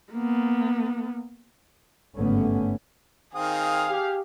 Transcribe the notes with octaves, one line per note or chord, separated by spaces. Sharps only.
A#3 B3
G#1 G2 D3 A3 B3 C#4
D#3 C4 G#4 F5 D#6
G4